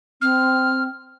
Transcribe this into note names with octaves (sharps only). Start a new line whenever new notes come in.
C4 F6